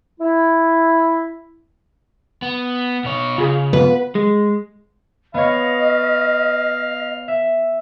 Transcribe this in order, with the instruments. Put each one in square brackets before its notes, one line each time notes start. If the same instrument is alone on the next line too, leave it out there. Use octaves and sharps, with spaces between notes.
[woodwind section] E4
[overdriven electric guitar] B3
B2 C#5
[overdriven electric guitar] C#3 [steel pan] F4 G#4
[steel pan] B3 F4 [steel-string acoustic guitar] B4
[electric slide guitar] G#3
[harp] B3 C#5 [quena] D#5 [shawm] F5
[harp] E5